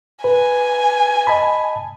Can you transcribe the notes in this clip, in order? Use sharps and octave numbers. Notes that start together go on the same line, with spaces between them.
B4 G#5
D#5 A5 B5